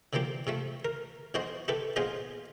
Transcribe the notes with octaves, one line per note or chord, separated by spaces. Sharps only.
D3 E3 F3 A#3 G4
C3 F3 A3
A#4
B1 E3 F#4 C5 D#5
E4 G4 A4 B4
A#1 B3 F4 G#4 C5 D#5